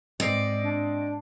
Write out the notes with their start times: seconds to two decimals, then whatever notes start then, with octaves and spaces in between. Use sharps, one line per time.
0.20 G#2 C4 D5 D#5 C7
0.64 D4